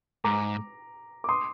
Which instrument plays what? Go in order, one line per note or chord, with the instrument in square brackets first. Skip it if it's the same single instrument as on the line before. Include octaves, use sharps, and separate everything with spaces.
[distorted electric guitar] G#2 [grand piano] A#5 D6
[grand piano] D6
C6 D#6